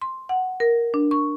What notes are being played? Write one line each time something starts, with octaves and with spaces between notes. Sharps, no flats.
C6
F#5
A#4
D4
C#6